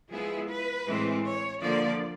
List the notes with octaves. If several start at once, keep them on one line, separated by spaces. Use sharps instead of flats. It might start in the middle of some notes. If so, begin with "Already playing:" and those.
F3 G#3 B3 E4 G#4
B4
A2 E3 G#3 C4
C#5
D3 F3 A#3 D5